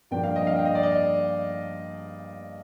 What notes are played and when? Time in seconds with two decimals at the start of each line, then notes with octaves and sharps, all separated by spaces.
0.11 G2 F3 A#3 D4 G5
0.24 F5
0.36 D#5
0.47 F5
0.56 G5
0.65 D#5
0.75 D5
0.83 D#5